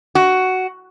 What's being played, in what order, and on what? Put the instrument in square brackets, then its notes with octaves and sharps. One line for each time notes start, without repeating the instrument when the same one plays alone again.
[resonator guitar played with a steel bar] F#4